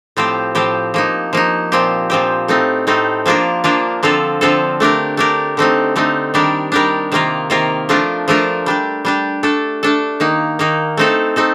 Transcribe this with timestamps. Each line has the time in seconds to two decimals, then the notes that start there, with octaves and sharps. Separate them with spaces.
0.17 A2 F3 C4 G4
0.55 A2 F3 C4 G4
0.94 F3 A#3 D#4
1.33 F3 A#3 D#4
1.72 A#2 F3 C4 G4
2.10 A#2 F3 C4 G4
2.48 A2 A3 C4 D#4
2.87 A2 A3 C4 D#4
3.26 F3 A#3 D4 F4 A#4
3.64 F3 A#3 D4 F4 A#4
4.03 D3 F3 C4 F4 A4
4.41 D3 F3 C4 F4 A4
4.80 A3 D4 G4 A#4
5.17 A3 D4 G4 A#4
5.57 D3 A3 C4 D#4
5.96 D3 A3 C4 D#4
6.34 D#3 G3 D4 G4 A#4
6.72 D#3 G3 D4 G4 A#4
7.12 C3 D#3 A#3 F4 A#4
7.50 C3 D#3 A#3 F4 A#4
7.89 F3 A3 D4 F4 A#4
8.28 F3 A3 D4 F4 A#4
8.66 G3 D4 G4
9.05 G3 D4 G4
9.43 A3 D4 A4
9.83 A3 D4 A4
10.20 D#3 A#3 D#4
10.59 D#3 A#3 D#4
10.97 A3 C4 D#4 A4
11.36 A3 C4 D#4 A4